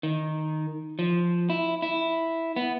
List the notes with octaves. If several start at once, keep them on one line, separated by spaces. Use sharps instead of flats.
D#3
F3
E4
E4
B3